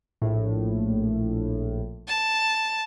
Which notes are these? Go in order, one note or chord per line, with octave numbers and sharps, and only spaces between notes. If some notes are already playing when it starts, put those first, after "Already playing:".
A#1 A2
A5